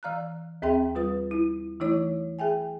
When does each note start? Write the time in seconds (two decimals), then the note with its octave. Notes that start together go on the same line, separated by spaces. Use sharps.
0.03 E3 D5 F5 A#5 F6 F#6
0.62 D#2 C4 G#4 E5 G5 C6
0.95 G3 F4 B4 D#6
1.31 E4
1.80 E3 A3 D#4 E4 C#5
2.39 G#4 E5 G5 G#5